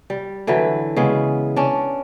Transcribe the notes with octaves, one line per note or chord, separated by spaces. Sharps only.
G3
D3 E3 F#3 B4
C#3 G#3 B3
C#4 D4